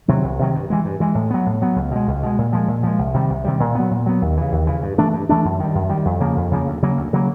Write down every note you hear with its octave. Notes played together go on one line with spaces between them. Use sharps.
C3 D#3 F#3
C2
C3 D#3 F#3
G2
E3 G#3
G2
E3 G#3
A2
F#3 B3
A2
F#3 B3
C#2
B2 G#3
C#2
B2 G#3
A#2
F3 G#3
A#2
F3 G#3
C2
C3 D#3 G3
C2
C3 D#3 G3
A#2
F#3 B3
A#2
F#3 B3
D#2
C#3 E3
D#2
C#3 E3
G2
E3 A3 D4
G2
E3 A3 D4
F#2
D#3 G3
F#2
D#3 G3
F2
C#3 F3 A#3
F2
C#3 F3 A#3
D2
C#3 F#3 A#3
D2
C#3 F#3 A#3